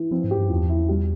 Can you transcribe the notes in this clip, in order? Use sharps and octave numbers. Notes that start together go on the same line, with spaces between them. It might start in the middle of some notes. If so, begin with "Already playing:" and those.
Already playing: E3
F3 C4
G#2
G4
G2
E2 F3
E4
G3